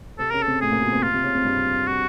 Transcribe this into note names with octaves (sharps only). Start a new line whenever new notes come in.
C3 C4 A4
C#3 C#4 A#4
C3 C4 A4
A2 A3 G#4
A#2 A#3
B2 B3
C3 C4
F4
C3 C4
C#3 C#4
C3 C4
G2 G3
F#4